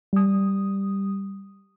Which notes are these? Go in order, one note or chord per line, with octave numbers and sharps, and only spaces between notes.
G3 D#6